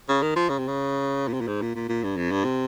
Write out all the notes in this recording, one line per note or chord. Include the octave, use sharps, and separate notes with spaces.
C#3
D#3
F3
C#3
C3
C#3
A#2
C3
A#2
G#2
A#2
A#2
A#2
G2
F2
G2
C3